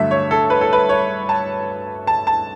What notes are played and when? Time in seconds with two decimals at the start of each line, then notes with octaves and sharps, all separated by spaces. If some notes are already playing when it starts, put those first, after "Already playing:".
Already playing: G2 D3 F#3 A3 E5
0.11 C#5
0.31 A4
0.50 B4
0.61 A4
0.73 B4
0.89 C#5
1.29 A5
2.07 A5
2.27 A5